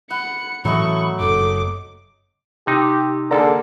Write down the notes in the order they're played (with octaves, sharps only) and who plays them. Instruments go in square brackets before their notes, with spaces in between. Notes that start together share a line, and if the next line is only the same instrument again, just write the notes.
[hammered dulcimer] F#5 [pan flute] B5 [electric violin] C#7
[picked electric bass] A2 E3 [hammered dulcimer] F#3 A3 D#5 [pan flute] B5 [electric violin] C#6
[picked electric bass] F#1 [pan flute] A4 [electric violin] D6
[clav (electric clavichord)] C3 D#4 [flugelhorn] G4
[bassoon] D3 [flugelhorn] A#3 [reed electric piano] G#4 A4 A#5